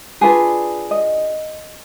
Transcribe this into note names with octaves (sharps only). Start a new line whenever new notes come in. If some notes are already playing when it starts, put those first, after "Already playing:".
D4 F4 G#4 B4
D#5